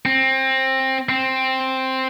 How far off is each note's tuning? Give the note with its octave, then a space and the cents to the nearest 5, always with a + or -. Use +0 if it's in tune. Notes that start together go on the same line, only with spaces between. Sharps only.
C4 +20
C4 +5